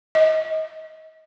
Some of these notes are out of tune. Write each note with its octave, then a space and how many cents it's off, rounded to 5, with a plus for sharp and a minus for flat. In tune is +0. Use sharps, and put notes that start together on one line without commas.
D#5 +25